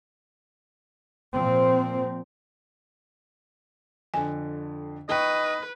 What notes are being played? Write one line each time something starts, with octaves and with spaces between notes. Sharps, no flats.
A#2 F3 C4
F2 D3 G#5
D#4 B4 D#5 G5 C#6